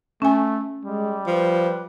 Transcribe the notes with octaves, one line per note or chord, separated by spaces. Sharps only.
A3 C#4 G#5
G3 G#3
F3 B4